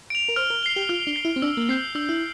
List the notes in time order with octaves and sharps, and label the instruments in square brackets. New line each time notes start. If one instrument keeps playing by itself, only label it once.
[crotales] D7 F7
[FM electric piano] A#4
[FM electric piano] C5 [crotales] F6
[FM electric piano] A#4
[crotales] C7 G7
[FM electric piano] G4
[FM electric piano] F4 [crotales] F6
[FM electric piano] D4
[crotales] C7 G7
[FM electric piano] E4
C4
[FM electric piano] D4 [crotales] E6
[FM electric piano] A#3
[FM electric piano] C4 [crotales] G6 C7
[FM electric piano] D4 [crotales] E6
[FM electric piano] E4